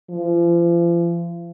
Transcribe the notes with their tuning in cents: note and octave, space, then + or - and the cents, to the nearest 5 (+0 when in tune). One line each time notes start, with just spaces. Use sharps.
F3 -40